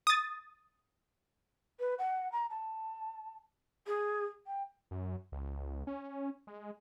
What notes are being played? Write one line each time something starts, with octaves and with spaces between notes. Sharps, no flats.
D#6 A6
B4
F#5
A#5
A5
G#4
G5
F#2
C#2
C#4
G#3